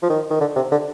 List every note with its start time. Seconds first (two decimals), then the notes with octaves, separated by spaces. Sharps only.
0.03 F3
0.10 D#3
0.31 D#3
0.41 D3
0.56 C3
0.72 D3